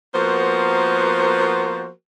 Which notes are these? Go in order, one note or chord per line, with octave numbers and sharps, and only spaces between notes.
F3 A#3 B3 F#4 A#4 C5